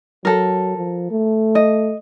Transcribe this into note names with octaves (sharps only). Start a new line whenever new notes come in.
F#3 A4 A#4
F3
A3
D#5